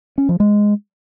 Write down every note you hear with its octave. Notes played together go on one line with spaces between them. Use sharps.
C#4
F3
G#3